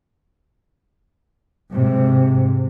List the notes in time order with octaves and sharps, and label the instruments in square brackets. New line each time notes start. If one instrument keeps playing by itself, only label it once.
[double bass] G#2 C3